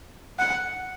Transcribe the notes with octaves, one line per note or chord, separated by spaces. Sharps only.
F#5